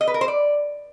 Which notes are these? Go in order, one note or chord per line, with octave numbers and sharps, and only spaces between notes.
D#5
B4
A#4
C5
D5